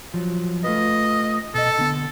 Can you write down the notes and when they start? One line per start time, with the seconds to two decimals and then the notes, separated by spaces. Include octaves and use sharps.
0.14 F3 F#3
0.64 A3 F4 B4 D#5
1.54 B2 A4 D#5
1.78 D3 B3